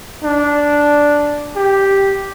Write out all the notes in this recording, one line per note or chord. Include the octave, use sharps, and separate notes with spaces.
D4
G4